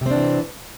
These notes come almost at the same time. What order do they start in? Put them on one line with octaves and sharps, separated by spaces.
C3 C4 D4 E3